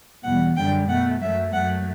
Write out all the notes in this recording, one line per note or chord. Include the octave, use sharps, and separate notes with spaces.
E2 B2 G3 F#5
F#2 D3 G3 G5
B2 A3 F#5
F#2 F#3 A3 E5
F#2 F#3 A3 F#5